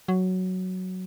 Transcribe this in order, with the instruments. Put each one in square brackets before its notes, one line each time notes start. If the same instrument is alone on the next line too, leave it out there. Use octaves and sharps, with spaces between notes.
[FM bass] F#3